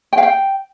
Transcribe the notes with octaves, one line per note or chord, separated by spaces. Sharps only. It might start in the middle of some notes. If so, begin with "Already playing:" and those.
G5
F5
G5